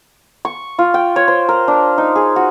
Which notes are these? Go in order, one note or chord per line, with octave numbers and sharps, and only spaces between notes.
C#6
F4
G5
C#5
C5
A#4
D4
D#4
G#4
F#4